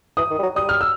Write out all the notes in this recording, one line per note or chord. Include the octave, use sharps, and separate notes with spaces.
E3 D#6
D#3
G3
F#3
G3 D#6
F6
E6